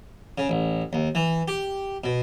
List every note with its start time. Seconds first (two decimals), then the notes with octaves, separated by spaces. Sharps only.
0.38 C#3
0.49 A1
0.93 D#2
1.15 E3
1.48 G4
2.04 B2